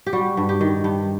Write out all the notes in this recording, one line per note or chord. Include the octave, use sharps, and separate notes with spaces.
G4
G3 F#4
G2
G4
D#3
G2 G4